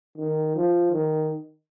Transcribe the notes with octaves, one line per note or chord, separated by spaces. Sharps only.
D#3
F3
D#3